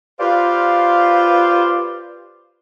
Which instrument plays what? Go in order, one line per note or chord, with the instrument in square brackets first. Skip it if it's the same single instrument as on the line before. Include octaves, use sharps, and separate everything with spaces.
[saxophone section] F4 G4 B4 C5 D5 F5